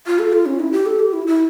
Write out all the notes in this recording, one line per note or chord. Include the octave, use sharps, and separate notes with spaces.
F4
A4
F4
C#4
E4
G4
A4
G4
E4
E4